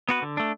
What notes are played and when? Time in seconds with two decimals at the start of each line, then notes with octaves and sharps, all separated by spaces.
0.09 B3 F#4 B4
0.22 D3
0.37 A3 D4